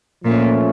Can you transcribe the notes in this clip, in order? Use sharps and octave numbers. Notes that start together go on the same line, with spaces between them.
A#2 F3 A3 C#4